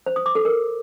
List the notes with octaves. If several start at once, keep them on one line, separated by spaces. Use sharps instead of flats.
C5
D#6
D6
A4
A#4